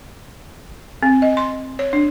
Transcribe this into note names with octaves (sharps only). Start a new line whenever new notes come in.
C4
D#5
C6
C#5
D4